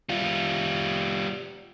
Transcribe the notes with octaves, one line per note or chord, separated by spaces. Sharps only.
G3 F4